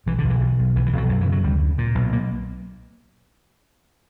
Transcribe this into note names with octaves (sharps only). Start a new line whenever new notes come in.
B1 E3
D3
B1
E3
B1
B1
B1 E3
E3
B1 F#3
F#2 F#3
E3
C#3
F#3
D2 G3
C#3
A#2
B1
A#3